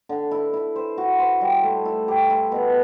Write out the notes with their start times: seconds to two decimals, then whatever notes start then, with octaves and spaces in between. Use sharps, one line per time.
0.09 D3
0.31 E4
0.54 E4
0.76 C5
0.98 F#4
1.19 C5
1.41 G3
1.63 A3
1.85 E4
2.08 G4
2.30 E4
2.52 B2